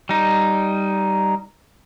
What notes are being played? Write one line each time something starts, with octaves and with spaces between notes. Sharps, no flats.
G3 D#4